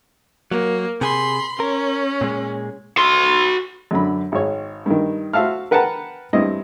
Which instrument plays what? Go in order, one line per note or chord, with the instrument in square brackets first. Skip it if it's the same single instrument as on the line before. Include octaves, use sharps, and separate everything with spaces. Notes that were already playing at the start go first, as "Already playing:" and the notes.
[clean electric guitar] F#3 [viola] A#3
[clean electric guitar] C3 G#4 [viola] B5 C6
[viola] C#4 [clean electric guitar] A#4
[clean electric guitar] A#2 G#3
[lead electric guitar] F#4 C6
[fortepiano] F#2 D3 B5
G#1 C#5
G2 D#3
F#4 C5 E5 F5 A5 F6
A#4 B4 F#5 G5 A5 A#5
G2 C4 E4 D#5